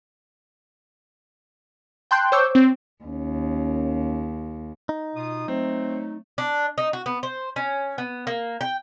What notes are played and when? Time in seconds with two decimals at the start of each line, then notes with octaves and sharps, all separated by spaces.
2.11 G5 A5 C6 F#6 G6
2.32 C5 C#5 C#6 D6 E6 G6
2.55 C4
3.04 D#2 C#4
4.89 D#4
5.16 B2 F4 D#6
5.48 F#3 A3 C4
6.38 D4
6.78 D#4
6.93 F#4
7.06 B3
7.23 C5
7.56 C#4
7.98 B3
8.27 A#3
8.61 G5